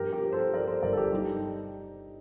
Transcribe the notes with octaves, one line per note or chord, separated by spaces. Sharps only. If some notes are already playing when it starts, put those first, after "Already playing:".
Already playing: G2 F3 G4 A#4
G4 A#4
F3
A4 C5
F3 A#4 D5
A4 C5
G1 A#4 D5
A4
G4 A#4
G3 D#4 G4